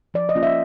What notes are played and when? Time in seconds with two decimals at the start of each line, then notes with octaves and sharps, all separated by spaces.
0.14 F3 D5
0.29 D#5
0.35 A#3 C#4 F4
0.43 E5